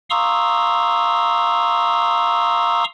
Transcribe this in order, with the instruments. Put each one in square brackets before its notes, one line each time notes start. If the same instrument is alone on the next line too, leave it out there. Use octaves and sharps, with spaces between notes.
[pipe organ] F5 A#5 C6 C#6 D#6 E6